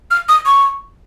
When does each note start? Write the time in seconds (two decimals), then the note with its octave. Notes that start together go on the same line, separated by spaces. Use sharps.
0.11 F6
0.29 D#6
0.46 C#6